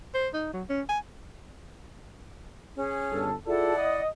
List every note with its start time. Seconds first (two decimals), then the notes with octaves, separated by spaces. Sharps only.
0.15 C5
0.33 D#4
0.53 F#3
0.69 C#4
0.89 G#5
2.76 C#4 G#4
3.12 G1 A4
3.47 E4 F4 G#4 A4 D5 F#5
3.77 D#5